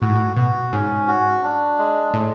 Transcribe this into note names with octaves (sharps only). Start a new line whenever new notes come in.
A2 F#4
G#2
A2
B2 F#4
G#2 C#4
F#4
D4
G#3
A2 G#3